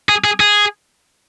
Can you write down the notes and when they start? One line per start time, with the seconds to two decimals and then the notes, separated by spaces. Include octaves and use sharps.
0.09 G#4
0.24 G#4
0.40 G#4